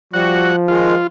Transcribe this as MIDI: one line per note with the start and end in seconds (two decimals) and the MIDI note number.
0.14 1.04 53
0.14 0.52 55
0.14 0.52 66
0.14 0.56 78
0.68 0.95 51
0.68 0.95 56
0.68 1.07 65